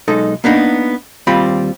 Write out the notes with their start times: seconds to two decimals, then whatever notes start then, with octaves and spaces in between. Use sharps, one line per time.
0.08 B1 G#3 D#4 A4
0.44 A#3 B3 D4 D#4
1.27 D#2 G3 C4 F4 B5